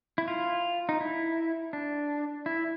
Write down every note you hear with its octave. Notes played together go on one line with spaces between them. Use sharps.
E4
F4
D#4
E4
D4
E4